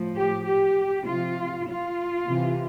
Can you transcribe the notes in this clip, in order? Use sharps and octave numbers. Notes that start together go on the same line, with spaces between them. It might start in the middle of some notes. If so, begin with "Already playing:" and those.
Already playing: A2 F3
G4
G4
C3 F3 F4
F4
C3 E3